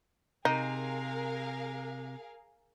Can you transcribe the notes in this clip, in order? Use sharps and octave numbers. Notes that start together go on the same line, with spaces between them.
C3 D#4 G#4 A#4 F5